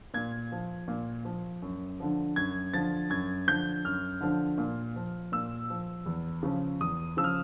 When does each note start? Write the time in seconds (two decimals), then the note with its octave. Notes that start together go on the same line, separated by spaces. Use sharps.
0.14 A#2 G#6
0.52 F3
0.88 A#2
1.25 F3
1.62 F#2
2.00 D3 F3
2.36 F#2 G#6
2.74 D3 F3 A6
3.10 F#2 G#6
3.47 D3 F3 G6
3.85 F#2 F6
4.21 D3 F3
4.58 A#2
4.96 F3
5.32 A#2 E6
5.70 F3
6.06 E2
6.43 C#3 F3
6.80 E2 D#6
7.17 C#3 F3 E6
7.24 F6